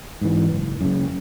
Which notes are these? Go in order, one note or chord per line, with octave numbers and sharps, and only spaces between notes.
G#2 E3
F#1
F#2 C#3